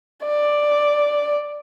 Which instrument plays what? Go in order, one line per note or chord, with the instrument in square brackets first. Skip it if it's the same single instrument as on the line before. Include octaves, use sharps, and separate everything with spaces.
[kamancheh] D5